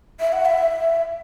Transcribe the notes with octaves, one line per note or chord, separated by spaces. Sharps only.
E5
F#5
E5